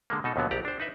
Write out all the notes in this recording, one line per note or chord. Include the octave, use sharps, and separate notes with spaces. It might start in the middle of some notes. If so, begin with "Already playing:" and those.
D3 G#3 A#3
B2 D#4 A4
D#2 B2 D3 F#3 B3
A#1 G4 D5 A#5
D4 C5
D#4 B4 E5